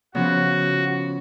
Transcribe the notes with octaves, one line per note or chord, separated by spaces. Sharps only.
C#3 F3 B3 F#4